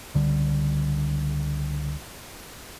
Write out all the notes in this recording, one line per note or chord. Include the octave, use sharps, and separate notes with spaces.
C#2 D3 G3